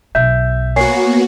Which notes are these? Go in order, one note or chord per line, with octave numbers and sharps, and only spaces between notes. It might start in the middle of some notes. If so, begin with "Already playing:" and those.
B1 B2 E5 G6
A#3 B3 F#4 C#5 G#5 C7